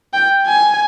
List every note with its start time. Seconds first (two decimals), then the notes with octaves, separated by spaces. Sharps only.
0.13 G5
0.47 G#5